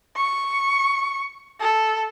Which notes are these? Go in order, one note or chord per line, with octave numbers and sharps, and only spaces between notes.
C#6
A4